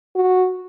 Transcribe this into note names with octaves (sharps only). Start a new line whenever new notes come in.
F#4